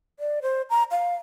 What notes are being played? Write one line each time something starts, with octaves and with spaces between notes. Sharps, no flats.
D5
C5
A#5
F5